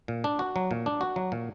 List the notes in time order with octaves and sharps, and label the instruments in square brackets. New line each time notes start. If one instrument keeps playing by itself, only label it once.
[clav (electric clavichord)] A#2
D4
F#4
F#3
A#2
D4
F#4
F#3
A#2